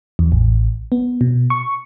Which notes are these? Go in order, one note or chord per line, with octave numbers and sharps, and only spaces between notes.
E2
A1
B3
B2
C#6